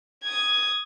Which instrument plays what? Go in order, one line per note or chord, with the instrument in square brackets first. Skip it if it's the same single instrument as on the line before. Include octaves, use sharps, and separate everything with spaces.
[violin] D#6 G#6